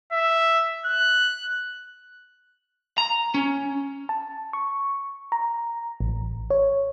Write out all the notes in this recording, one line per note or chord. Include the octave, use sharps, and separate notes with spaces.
E5
F#6
A#5
C#4
A5
C#6
A#5
A1
C#5